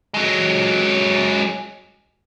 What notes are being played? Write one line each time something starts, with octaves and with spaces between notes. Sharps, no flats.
F#3 G#3